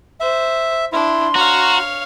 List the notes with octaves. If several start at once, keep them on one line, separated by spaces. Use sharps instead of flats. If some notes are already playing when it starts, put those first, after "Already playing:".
C5 E5
D4 E4 C6
F#4 C#5 F5 A#5